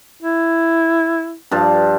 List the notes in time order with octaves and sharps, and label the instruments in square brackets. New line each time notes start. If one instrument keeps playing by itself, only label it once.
[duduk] E4
[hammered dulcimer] G2 F3 A5